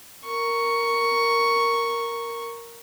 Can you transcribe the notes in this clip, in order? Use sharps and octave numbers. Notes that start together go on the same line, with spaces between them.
A#4 C#6